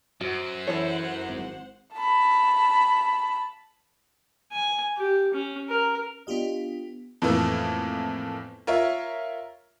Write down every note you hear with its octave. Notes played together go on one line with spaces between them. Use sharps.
F#2 F#4 C5 F#5
E3 E4 A4 C#5
G#1
A5 B5
G#5
G4
C#4
A#4
B3 D4 F4 G4 D#5
F2 A2 E3 A#3 B3
F4 A#4 C#5 E5